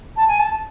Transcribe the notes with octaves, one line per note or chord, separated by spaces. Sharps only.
A5
G#5
A5